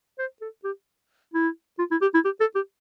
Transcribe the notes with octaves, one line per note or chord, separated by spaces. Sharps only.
C5
A4
G4
E4
F4
E4
G4
E4
G4
A4
G4